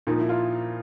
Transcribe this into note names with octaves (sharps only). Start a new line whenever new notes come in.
A#2 F3 D#4
E4
F4